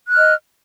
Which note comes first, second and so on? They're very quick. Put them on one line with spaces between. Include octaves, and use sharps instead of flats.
F#6 F6 D#5